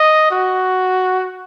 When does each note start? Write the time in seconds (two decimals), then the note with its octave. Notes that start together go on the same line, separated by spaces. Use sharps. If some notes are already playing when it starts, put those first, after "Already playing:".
Already playing: D#5
0.31 F#4